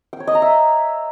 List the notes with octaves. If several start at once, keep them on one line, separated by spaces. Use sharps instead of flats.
G5
C#5
D#5
A#5
E5